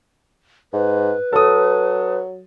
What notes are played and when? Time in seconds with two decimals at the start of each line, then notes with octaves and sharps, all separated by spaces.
0.73 G#2 B4
1.33 F#3 A4 D#6